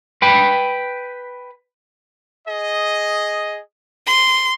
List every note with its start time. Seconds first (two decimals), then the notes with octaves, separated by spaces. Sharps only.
0.22 B4 G5 B5
2.47 G#4 D#5
4.06 C6